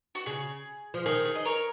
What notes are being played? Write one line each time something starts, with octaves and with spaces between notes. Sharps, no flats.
F#4
C#3 G#4
F3
D#3 G#4
G#4
D#5
A#4 C#5